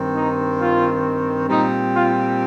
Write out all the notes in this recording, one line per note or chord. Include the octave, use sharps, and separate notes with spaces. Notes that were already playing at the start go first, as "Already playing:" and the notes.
Already playing: G2 D#3 C4
D#4
F4
A#2 G3 C4 D#4
F4